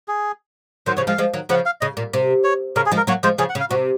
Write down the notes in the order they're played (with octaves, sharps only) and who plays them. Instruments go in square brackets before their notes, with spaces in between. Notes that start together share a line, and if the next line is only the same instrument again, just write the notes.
[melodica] G#4
[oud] D#3 F#3 [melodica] C5
[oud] C#3 F3 [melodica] C#5
[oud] F3 G#3 [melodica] F5
[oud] F3 G#3
D#3 F#3
[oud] C#3 F3 [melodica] F#5
[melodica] F5
[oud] C#3 [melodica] D#5
[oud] A#2
C3
[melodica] C#5
[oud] C#3 [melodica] A#4
[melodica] G#4
[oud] F3 G#3
[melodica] A#4
[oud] F#3 A#3 [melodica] C#5
[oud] F3 G#3 [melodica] C5
[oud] C#3 F3 [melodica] G#4
[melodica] F#5
[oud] C#3
[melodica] F5
[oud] C3 [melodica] F#4